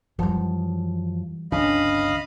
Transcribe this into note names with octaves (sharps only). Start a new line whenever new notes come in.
F#2 E3 F3 G3
G1 C#2 D3 C#4 D#5 F5 B5